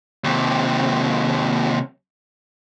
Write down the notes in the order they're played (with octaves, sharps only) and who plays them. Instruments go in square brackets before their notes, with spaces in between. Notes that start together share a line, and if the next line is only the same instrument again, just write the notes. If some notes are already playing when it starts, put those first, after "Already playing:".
[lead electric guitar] D#2 C3